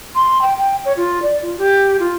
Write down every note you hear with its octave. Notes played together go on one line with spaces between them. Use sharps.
C6
G5
G5
C#5
F4
D5
F4
G4
F4